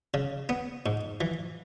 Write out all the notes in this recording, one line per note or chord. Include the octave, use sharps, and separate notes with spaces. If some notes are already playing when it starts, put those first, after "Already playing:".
C#3
B3
G#2
E3